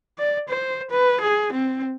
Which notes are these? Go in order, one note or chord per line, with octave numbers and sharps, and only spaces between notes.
D5
C5
B4
G#4
C4